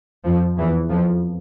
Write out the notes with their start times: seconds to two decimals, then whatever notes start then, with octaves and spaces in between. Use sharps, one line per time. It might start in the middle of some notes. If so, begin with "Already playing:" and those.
0.25 F2 F3
0.58 E2 E3
0.90 F2 F3